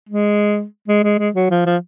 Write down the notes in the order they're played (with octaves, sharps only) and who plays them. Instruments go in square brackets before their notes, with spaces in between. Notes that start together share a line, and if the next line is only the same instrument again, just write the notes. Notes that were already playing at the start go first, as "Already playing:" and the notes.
[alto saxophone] G#3
G#3
G#3
G#3
F#3
F3
F3